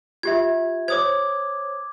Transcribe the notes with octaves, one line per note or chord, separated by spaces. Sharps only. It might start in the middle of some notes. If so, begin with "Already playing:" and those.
F4 G4 E5 G#6
C5 C#5 D6 D#6 G#6